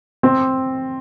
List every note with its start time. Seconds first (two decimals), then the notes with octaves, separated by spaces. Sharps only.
0.23 C4